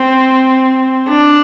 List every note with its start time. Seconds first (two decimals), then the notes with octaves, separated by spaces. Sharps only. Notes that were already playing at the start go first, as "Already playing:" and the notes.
Already playing: C4
1.09 D4